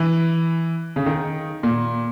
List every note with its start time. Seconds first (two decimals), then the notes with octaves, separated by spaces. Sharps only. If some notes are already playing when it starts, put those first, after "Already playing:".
Already playing: E3
0.96 C#3
1.06 D#3
1.63 A#2